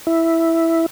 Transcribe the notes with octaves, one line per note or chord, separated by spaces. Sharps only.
E4